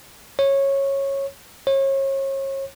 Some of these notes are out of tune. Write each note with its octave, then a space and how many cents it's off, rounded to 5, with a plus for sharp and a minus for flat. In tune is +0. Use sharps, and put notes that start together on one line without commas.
C#5 -15
C#5 -35